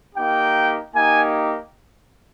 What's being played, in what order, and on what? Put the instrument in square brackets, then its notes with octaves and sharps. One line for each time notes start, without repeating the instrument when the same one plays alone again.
[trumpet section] A#3 D#4 G4 G5
A#3 D#4 G4 G#5